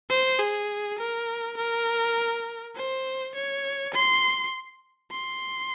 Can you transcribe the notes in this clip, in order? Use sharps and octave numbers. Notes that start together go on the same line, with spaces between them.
C5
G#4
A#4
A#4
C5
C#5
C6
C6